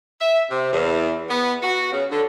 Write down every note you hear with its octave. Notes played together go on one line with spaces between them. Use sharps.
E5
C3
E2
B3
F#4
C#3
D3